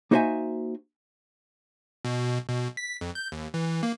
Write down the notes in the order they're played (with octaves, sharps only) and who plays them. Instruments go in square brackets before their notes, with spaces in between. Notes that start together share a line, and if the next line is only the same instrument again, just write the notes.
[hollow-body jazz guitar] A#3 D#4 F#4 C5 E5 G#5
[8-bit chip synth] B2
B2
B6
F2
G6
D#2
E3
A#3